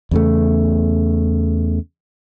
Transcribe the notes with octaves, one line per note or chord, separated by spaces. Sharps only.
E2 C#3 A3